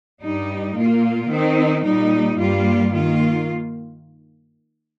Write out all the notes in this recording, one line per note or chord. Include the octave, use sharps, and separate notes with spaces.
G2 G3 D#4
A#2 A#3 F4
D#3 C4 D#4
A#2 G3 D#4
G2 G3 A#3 F4
D#3 A#3 F4